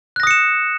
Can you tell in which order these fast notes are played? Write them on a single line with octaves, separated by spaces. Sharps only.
F#6 A#6 D#6 C#7 E7